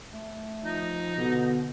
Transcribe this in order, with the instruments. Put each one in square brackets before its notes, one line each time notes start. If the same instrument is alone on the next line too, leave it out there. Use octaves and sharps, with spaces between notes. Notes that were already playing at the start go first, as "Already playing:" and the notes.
[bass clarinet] A3
[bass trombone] F3 [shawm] D#4
[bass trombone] B2 [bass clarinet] D3